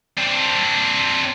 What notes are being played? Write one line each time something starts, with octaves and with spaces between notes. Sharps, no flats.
C4 D4